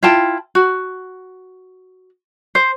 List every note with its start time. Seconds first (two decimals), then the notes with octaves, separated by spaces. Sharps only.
0.03 E4 F4 G5 A5
0.55 F#4
2.55 C5